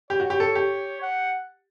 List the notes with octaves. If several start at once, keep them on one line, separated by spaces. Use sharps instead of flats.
G4 C#5
F#4
G4
A4
G4
F#5